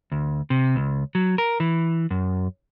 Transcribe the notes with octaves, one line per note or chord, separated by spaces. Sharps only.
D2
C3
C#2
F#3
A#4
E3
F#2